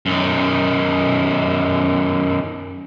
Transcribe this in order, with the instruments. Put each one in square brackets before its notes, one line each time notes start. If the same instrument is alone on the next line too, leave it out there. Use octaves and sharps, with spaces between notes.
[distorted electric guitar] F#2 D#3